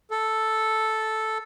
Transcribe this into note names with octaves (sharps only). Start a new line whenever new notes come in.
A4